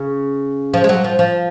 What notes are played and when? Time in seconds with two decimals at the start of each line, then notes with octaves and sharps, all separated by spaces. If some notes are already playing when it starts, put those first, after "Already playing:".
Already playing: C#3
0.74 F3
0.84 G#3
0.89 F#3
1.04 F3
1.19 F3